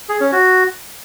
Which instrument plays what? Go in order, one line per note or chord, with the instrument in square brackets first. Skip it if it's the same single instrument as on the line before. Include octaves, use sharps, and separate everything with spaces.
[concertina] G#4
C#4
F#4